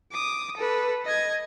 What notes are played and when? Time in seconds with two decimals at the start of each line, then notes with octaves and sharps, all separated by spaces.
0.12 D6 D#6
0.57 A4 B4
1.05 D#5 G#6